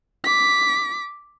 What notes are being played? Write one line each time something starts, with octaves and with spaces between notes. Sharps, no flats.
D6 B6